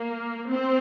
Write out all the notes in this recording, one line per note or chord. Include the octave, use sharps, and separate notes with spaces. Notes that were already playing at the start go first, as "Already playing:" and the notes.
Already playing: A#3
C4